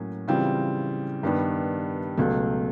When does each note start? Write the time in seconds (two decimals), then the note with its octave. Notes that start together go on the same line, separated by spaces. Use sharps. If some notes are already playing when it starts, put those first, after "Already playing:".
Already playing: A2 F#3 A#3 C#4
0.28 C#3 E3 G3 C4 F4
1.23 G2 D#3 G3 B3
2.17 C#2 B2 F#3 A3